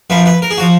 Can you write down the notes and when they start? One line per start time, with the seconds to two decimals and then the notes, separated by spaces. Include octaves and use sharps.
0.10 F#2 F3 B4
0.26 B4
0.42 A#4
0.51 G#4
0.58 F#4
0.61 F3